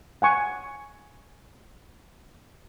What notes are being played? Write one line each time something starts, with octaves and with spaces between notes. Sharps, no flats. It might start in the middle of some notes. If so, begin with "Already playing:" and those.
F#5 G#5 C#6